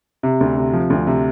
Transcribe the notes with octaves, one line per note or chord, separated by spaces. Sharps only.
C3
D2
C3
F3
D2
C3